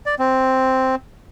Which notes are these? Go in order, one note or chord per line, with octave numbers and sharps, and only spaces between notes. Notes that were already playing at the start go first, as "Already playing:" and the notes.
D5
C4